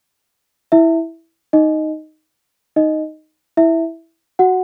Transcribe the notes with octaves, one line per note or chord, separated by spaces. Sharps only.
E4 E5
D#4 D#5
D#4 D#5
E4 E5
F#4 F#5